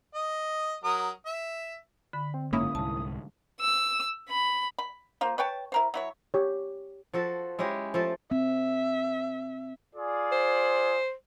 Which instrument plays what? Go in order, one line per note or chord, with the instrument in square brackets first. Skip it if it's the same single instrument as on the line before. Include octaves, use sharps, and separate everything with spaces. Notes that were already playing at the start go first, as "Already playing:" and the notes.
[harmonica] D#5
F#3 A#4 D#6
E5
[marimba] D3 [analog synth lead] B5
[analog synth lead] C4
[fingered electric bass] F#1 G#2 [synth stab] A#3 C#4 E4 [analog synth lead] D#6
[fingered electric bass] C2 G#2 [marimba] A5
[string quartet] E6
B5
[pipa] B5
A#3 F4 C5
B4 C#5 G5 A5
E4 A#4 C5
F#3 E4 C#5
[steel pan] G4 C#5
[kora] F3 F#4 A4
G#3 C#4 E4 G4
F3 A3 A4
[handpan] C4 [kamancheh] E5
[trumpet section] F4 G#4 D5
[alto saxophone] C5